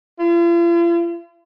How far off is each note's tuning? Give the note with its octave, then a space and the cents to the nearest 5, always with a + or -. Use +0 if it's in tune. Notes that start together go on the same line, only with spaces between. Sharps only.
F4 -45